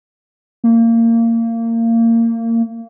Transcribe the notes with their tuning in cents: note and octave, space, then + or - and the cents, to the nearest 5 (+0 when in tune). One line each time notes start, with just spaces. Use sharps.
A#3 -25